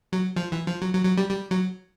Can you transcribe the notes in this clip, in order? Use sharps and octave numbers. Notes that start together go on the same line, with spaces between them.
F#3
F3
E3
F3
F#3
F#3
F#3
G3
G3
F#3